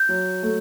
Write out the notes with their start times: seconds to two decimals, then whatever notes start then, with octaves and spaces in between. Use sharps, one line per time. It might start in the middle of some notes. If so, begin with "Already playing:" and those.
Already playing: G6
0.09 F#3
0.43 A3